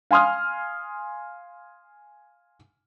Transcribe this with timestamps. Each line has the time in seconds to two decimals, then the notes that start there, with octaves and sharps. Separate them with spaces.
0.11 F5 G#5 C6 D#6 F6